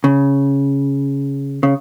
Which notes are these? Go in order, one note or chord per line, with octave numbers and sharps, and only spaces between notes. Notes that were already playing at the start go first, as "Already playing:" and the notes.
C#3
C#3